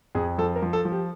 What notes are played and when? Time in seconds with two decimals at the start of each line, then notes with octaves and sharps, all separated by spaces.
0.15 F2 G#4
0.38 F3 A4
0.56 A#4
0.62 F3
0.73 A4
0.85 F3
0.92 G4